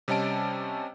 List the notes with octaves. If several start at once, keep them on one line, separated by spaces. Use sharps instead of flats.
C3 G3 C#4 D#5 A5 D7